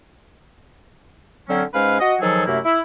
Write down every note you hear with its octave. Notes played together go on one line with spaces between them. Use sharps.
D3 F#3 C4 C#4
G#2 G#3 C#4 B4 F5
F#4 D#5
D#3 F3 F#3 G#4 A4
F#2 C3 A3 A#3 E4
E4